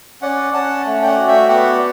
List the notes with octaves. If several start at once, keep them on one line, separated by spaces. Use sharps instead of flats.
C#4 D5 F#5
C#4 F#5 A5
A3
G5
D5 F#5
F#4
E5 G5
B3 D5 F#5